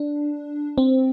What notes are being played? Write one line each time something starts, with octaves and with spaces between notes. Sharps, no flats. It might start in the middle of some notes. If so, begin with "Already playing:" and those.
Already playing: D4
C4